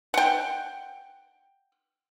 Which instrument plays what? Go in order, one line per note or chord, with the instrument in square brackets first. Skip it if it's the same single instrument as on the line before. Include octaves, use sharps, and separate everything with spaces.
[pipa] F#5 G5